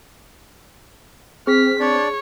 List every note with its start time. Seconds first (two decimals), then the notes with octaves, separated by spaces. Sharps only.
1.47 C4 G#4 F6 B6
1.80 D4 C#5 D5